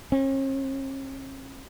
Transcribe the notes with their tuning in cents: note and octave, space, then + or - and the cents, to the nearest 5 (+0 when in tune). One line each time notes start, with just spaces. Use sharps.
C#4 -45